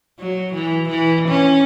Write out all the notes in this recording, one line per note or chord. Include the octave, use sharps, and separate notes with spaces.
F#3
E3
E3
C#4